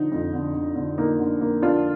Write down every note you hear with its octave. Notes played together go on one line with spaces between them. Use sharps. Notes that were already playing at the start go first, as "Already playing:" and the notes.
Already playing: D3 F3 D#4
F2
D3
D3
D3
A#3 D#4
D3
A#3
A#3 D4 F4